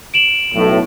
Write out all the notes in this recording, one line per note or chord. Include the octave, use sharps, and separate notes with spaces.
D7 E7 F#7
B1 A2